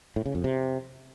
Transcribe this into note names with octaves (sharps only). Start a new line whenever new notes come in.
A2
C#3
F2
C3